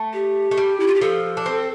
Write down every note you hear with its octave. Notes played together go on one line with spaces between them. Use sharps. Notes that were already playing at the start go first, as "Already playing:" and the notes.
Already playing: A3
G4
A3
G3
E4
F4
G4
F3 A4
D4
C4